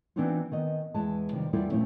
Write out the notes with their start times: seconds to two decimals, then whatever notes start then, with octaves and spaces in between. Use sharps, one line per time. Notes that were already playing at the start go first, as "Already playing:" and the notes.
0.16 E3 B3 C4 D4 D#4 F4
0.51 D#3 B3 D#5
0.94 E2 E3 G#3 A5
1.32 C3 D#3 F3 G3
1.53 E2 G3 A#3 E4 F4 A4
1.70 A#2 F3 A3 C4 C#4 E4